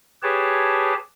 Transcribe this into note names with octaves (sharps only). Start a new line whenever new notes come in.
G4 G#4 B4 C#5 A5